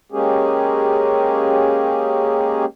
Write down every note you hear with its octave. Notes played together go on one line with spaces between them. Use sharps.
G#3 A#3 C#4 G4 G#4